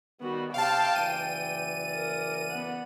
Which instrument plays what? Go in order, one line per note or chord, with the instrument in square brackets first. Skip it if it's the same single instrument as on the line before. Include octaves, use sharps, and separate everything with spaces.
[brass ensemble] D#3 G3 [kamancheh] B3 F#4
[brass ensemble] C3 [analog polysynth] F5 A5 [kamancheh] G5
[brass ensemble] F#1 E3 D5 [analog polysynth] D#7
[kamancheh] A#4
B3 F#5